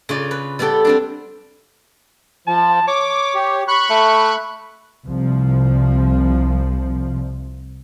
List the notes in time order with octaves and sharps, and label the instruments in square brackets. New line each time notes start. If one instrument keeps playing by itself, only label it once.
[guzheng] C#3 F4 D5
B4
G3 B3 G4 A4 G5
G3 C4 D4
[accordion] F3 [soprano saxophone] A5
[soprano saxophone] C#5 [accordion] D6
[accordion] G4
B5 C#6 F#6
[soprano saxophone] A3
[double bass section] C2 F3